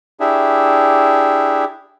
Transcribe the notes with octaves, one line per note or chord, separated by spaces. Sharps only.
D4 E4 G4 G#4 E5